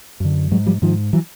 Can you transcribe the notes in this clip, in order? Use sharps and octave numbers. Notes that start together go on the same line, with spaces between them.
F#2 D3
G#2 F#3 G#3
F3 G3
G#2 D#3 F3
E3 F#3